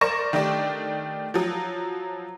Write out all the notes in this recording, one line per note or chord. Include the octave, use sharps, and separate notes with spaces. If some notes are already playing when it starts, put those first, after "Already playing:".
A#4 C5 D5 C#6 A#6 E7
D#3 A3 D4 G4 D5
F3 F#3